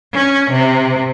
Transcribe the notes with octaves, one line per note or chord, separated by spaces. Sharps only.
C#4
C3